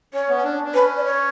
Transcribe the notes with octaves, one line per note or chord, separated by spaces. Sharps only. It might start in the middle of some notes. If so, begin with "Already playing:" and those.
C#4 C#5
B3
C#4
D4
D4
C#4 B4
D5
C#5